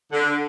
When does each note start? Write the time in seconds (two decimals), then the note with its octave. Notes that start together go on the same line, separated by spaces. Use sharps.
0.13 D3